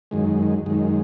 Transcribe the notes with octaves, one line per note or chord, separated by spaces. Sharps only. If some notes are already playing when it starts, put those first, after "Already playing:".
F#2 D#3 G#3
F#2 D#3 G#3